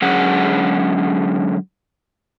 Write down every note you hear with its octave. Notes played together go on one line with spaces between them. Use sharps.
D3 F#3 G#3 C#4 G#4 F#5